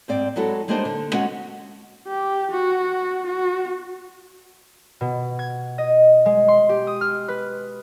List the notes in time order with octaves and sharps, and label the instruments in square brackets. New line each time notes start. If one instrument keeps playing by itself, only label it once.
[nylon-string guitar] G#2 C4 D5
F#3 G#3 E4 F#4 A4
G3 G#3 A#3 D4 D#4 C5
D3
G#3 C#4 F#4 F#5
[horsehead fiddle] G4
F#4
F#4
[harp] B2
G#6
D#5
G#3
C6
G4
D#6
F6
B4